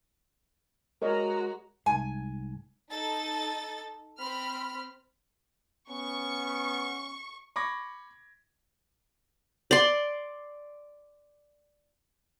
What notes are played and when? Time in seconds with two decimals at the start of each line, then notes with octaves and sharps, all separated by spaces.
1.02 G#3 F#4 A#4 C#5 D#5 A#5
1.86 C2 G#2 G#5
2.90 D#4 A4 A6
4.17 C4 B5 F6
5.90 B3 C#4 C#6
7.56 B5 C#6 D6 G#6 A#6
9.71 D5 C6